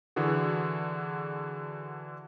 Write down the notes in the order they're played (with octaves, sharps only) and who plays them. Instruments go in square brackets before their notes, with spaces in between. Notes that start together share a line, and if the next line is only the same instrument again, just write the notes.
[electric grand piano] D3 E3 F#4 G#4